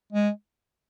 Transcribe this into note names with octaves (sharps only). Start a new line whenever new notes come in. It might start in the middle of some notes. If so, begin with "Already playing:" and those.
G#3